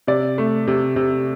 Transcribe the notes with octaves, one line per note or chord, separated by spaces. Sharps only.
C3 D5
A3
C3
C3